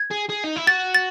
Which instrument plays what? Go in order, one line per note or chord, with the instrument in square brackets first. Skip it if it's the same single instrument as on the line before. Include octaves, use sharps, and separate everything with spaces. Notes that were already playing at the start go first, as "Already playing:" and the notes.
Already playing: [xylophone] G#6
[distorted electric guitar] G#4
G#4
D#4
E4
[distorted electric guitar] F#4 [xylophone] A6
[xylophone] A6